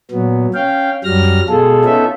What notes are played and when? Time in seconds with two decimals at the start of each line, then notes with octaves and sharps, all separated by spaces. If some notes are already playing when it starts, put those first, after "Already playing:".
0.11 A#2 F#3 B3
0.54 C#4 F5 G5
1.04 F#2 F#3 G3 F6 A#6
1.48 B2 G#3 F4 G#4 A4
1.85 B3 C#4 D#4 F4 A4 E5